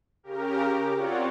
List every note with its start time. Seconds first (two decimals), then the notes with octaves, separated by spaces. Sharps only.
0.23 C#3 G4 A#4
0.66 D6
0.95 C4 F4 F#4 C#5 D5 F#5